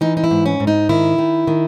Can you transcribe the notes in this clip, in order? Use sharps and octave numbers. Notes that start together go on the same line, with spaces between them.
E3 D#4
D#4
E4
G#2
C#4
G#2
D#4
D#3 E4
D#3
D#3